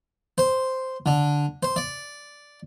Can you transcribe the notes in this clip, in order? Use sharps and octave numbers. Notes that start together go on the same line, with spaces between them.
C5
D3
C5
D5